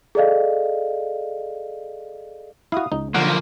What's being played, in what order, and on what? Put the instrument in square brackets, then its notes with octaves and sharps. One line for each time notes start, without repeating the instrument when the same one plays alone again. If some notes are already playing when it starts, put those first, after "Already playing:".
[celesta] G#4 A4 D5 D#5 F5
[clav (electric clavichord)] E4 F#4 [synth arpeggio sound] F5 D#6
[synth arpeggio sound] C#2 [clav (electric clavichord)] D#4
[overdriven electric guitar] B1 F3 [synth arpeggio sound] D3 [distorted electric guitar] A#3 [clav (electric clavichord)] F#5